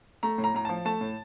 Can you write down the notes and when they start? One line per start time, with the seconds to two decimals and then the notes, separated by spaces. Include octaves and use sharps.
0.23 A3 A#5
0.38 A2
0.44 A#5
0.54 A2 A#5
0.65 F3 A5
0.85 A3 A5
1.01 A2